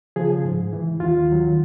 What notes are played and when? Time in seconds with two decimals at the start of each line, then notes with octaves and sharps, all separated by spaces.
0.16 C#3 F3 G#4
0.44 G#2
0.73 E3
1.00 D#2 F4
1.29 D#3 F#3